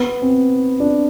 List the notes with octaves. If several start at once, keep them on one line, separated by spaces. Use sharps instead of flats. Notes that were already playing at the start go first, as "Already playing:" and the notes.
Already playing: B3
C4
D4